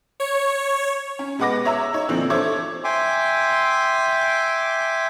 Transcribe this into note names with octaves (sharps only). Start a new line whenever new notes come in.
C#5
C#4
B2 G#3 B4 F#5 D6 A#6
C#5 E5 A#5 E6
D#4 C#5
A#2 D3 E3 F3 C4 D4
A4 C5 C#5 E5 D6 G#6
E5 G5 G#5 C6 D6